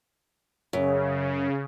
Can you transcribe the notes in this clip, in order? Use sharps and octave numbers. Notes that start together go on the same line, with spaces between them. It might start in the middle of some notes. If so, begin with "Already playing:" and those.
F#2 C#3